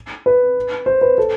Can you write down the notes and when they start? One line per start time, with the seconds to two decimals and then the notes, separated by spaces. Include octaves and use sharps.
0.26 B4
0.86 C5
1.01 B4
1.18 A4